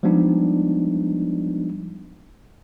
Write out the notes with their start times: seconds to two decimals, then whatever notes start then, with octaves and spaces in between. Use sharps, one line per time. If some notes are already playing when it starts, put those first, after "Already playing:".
0.03 F3 G3 G#3 B3 D4 D#4